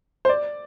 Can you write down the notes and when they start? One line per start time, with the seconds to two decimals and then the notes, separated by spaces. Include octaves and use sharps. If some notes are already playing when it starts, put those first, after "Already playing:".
0.25 C5
0.29 D5